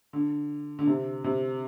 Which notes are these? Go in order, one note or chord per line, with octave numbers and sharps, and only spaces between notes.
D3
D3
C3
C3